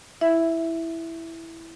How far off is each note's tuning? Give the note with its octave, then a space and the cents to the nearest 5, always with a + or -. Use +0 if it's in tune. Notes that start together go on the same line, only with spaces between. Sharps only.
E4 +0 E5 +0